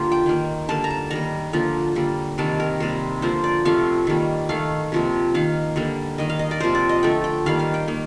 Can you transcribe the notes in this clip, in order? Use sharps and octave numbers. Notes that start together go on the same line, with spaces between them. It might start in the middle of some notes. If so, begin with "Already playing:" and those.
Already playing: D3 F3 A#3 F4 G4
G5
D#3 A#3
D3 G3 A#3 A5
A#5
A5
D#3 G3 A#3 A#5
D3 F3 A#3
D3 G3 A#3
C3 D#3 G3 A#3 A5
A#4
C3 G3 A#3 C5
D3 F3 A#3 C5
D5
C3 F3 A3 F5
D#3 G3 A#3
D#3 A3 F5
C3 F3 A#3
D#3 A#3 F5
D3 G3 A#3
D#3 A#3 D#5
F5
D#5
D5
C3 F3 A#3 C5
D5
D#5
D3 F3 A3 G5
G5
D#3 G3 A#3 F5
F5
G5
D#3 A#3